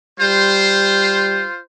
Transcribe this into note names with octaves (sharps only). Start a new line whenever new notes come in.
G3 F4 C5